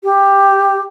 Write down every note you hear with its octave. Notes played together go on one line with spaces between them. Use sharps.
G4